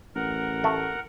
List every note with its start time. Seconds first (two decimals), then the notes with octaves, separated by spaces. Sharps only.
0.15 A1 A#4 F#5
0.64 A3